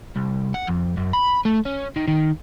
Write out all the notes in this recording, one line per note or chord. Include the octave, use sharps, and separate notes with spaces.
C2
F#5
F2
F#2
B5
A3
C#4
D#3
D#3